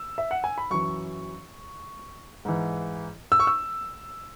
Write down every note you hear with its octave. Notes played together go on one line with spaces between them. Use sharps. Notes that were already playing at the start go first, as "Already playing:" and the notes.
Already playing: E6
E5
F#5
G#5
B5
F#2 E3 C#6
G#2 E3
E6
C#6
E6